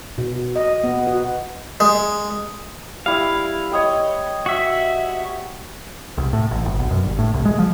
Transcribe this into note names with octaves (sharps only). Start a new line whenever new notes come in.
B2
D#5
B3
F#4
G#3
G3 E4 F5
C#5 D#5 G5
F#4 E5
C2
A2
A1
G1
B1
F#2
G1
A2
C2
G#3
F3